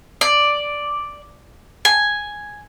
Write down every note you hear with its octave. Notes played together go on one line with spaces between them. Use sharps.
D5
G#5